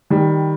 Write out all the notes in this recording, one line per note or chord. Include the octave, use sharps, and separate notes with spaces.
D#3 G3